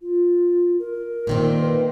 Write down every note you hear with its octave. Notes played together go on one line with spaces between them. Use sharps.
F4
A#4
A#2 D#3 C4
B4